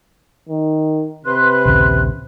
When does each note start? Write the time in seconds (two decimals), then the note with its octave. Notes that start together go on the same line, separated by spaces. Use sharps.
0.49 D#3
1.25 C3 B4 C6 F#6
1.65 A#1 D#2 C#3